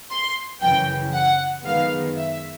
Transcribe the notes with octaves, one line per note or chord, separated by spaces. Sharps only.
C6
F#2 C#3 E3 G5
F#5
F#2 D#3 G#3 B3 F5
E5